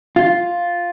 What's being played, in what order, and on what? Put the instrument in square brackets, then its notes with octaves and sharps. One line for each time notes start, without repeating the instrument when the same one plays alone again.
[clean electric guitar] F4